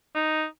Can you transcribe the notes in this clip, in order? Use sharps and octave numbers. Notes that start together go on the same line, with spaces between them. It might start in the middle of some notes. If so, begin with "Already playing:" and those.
D#4